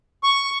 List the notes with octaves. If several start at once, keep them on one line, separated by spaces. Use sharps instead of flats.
C#6